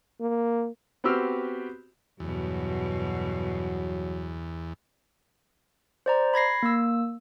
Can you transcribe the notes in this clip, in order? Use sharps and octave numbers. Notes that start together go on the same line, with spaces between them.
A#3
B3 C4 F#4 G4 E6 F6
E2 G2 B2 F#3
C5 D5 A#5
B5 G#6 A#6 C7
A#3 E6